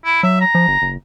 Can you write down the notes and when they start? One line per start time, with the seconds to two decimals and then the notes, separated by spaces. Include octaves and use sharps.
0.05 E4
0.23 F#3 E5
0.41 A#5
0.55 F3
0.68 G1
0.82 F#1